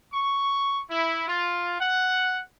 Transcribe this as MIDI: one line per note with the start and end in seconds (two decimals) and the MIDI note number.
0.13 0.81 85
0.89 1.24 64
1.27 1.76 65
1.79 2.40 78